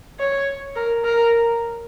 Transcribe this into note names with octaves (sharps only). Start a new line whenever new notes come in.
C#5
A#4
A#4